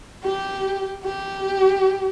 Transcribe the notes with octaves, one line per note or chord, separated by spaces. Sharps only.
G4
G4